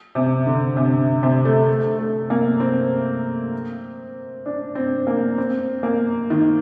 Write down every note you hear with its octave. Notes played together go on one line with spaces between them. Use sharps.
C3
D3
C3
C3
A3
A3
A3
A#3
C4
D4
C4
A#3
C4
A#3
D#3